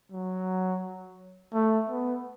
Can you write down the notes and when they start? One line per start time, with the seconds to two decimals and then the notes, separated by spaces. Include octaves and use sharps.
0.12 F#3
1.54 A3
1.89 B3